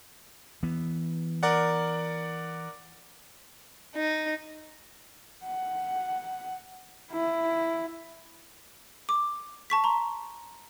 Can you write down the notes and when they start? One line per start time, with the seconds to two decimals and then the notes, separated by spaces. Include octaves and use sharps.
0.63 E3 B3
1.43 A#4 D5 F#5
3.95 D#4
5.44 F#5
7.12 E4
9.09 D6
9.70 A5 C#6 B6
9.84 A#5 C6